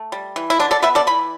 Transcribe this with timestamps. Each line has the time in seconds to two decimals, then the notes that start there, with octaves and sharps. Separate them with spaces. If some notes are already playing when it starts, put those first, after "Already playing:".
Already playing: A3
0.12 G3
0.36 E3
0.50 E4
0.59 D3 D4
0.71 A4 D5
0.82 B3 B4 E5
0.95 A4 D5
1.07 E3 B5